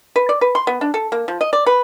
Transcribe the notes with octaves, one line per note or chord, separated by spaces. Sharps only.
B4
D5
B4
C6
B3
D4
A4
A#3
F3
D#5
D5
B4